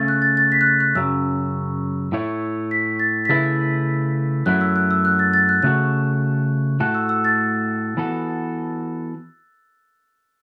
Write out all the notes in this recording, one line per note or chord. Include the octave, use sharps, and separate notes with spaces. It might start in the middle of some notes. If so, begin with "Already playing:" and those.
Already playing: C#3 A3 C#4 A6
F#6
A6
A6
B6
F#6
A6
F#6
F#2 C#3 F#3 E6
A2 A3 E4 C#5
B6
A6
B6
C#3 A3 E4 B4 A6
F#2 F#3 A3 E4 F#6
E6
F#6
E6
F#6
A6
A6
F#6
C#3 A3 F#4 A4 F#6
A2 A3 F#4 A4 F#6
E6
E6
A6
E3 B3 F#4 A4